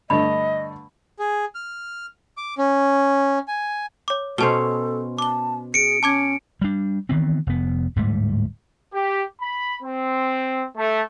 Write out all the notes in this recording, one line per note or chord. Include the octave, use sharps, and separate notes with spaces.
G2 D3 A3 D#5 B5
G#4
F6
D6
C#4
G#5
C#5 D6
B2 C#4 A4 C5 A5 G7
A5 D6 G7
G#4 C#7 D7
C#4 A5 D6 G#6
G3 D4
D#3 E3 B3 C4
F1 B3
D1 G#2 G3 A3
G4
B5
C4
A3